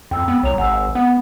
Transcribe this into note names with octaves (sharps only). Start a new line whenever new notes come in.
F2 G5 E6
B3
C2 C#5 A#5 F7
G#1 F#5 G#5 E6
B3 F#5